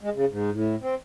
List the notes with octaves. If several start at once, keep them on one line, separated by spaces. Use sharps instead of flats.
G#3
C#3
G#2
A2
C4